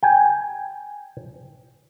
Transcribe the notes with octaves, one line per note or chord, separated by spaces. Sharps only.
G5 G#5